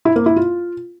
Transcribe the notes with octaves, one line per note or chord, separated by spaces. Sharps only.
E4
A#3
E4
F4